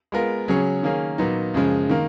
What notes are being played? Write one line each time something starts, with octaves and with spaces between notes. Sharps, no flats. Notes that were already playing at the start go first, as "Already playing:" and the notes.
G#3 B3 F4 A#4
C#3 F#3 C#4 G#4 C#5
D#3 A#3 C#4 G#4
A#2 F#3 B3 D#4
F#2 C#3 F3 G#3
D#3 A#3